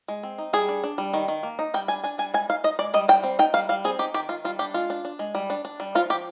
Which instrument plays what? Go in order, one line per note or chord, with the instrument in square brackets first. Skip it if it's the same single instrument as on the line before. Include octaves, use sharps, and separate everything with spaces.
[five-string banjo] G#3
C4
D#4
G3 G#4
D4
D4
G3
D#3
D#3
A#3
D#4
G3 G5
D4 G#5
D4 G#5
G3 G#5
G#3 G#5
D#4 F5
D#4 D#5
G#3 D5
G3 D#5
G3 G5
C4
D#4 G5
G3 F5
G3 F5
C4 G#4
D#4 G4
D#3 G4
D#3 F4
G3 F4
D4 G4
G#3 F4
D4
D4
G#3
G3
D4
D4
G3
F3 F4
F3 G4